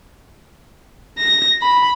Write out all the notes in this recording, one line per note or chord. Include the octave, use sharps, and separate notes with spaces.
A#6
B5